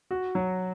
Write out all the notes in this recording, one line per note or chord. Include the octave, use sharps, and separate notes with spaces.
F#4
F#3